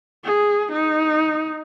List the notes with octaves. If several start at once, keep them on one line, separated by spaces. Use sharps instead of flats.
G#4
D#4